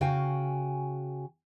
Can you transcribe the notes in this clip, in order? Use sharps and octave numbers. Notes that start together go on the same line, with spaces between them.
C#3 F#4 F5 G5 G#5